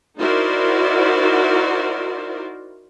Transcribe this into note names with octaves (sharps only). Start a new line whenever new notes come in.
D#4 E4 F#4 A#4 C5 D5